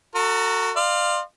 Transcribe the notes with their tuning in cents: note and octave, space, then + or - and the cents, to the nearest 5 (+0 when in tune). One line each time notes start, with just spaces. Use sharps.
F#4 +0 A4 +40 A#5 +0
D5 +40 F5 +0 C6 +0